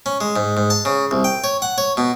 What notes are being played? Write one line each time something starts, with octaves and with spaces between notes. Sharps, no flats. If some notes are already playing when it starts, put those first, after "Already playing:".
C#4
G#3
G#2
G#2
A5
C#3
C2
G5
C#5
F#5
C#5
B2